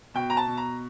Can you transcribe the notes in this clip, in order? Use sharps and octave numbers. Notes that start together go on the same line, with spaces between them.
B2 G5
A#5
A5
B2
A#5